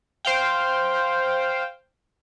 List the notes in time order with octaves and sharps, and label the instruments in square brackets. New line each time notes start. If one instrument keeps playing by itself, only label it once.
[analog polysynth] C5 F5 G5